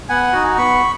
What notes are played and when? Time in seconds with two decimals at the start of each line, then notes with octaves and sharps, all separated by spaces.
0.09 B3 F#5 G#5
0.33 D#4 F#4
0.57 B3 B5 C#6